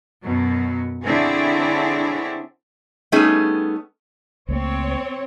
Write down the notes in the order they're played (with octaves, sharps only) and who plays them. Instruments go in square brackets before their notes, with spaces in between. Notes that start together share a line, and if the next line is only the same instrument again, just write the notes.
[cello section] F#2 B2 F#3
D3 C4 D4 E4 G#4 C#5
[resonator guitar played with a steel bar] G3 A3 B3 C#4 D#4 G#4
[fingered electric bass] C#2 A3 A#3 [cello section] C4 C#5